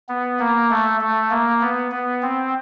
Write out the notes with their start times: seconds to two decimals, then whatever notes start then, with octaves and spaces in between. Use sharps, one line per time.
0.09 B3
0.39 A#3
0.70 A3
1.01 A3
1.31 A#3
1.61 B3
1.91 B3
2.23 C4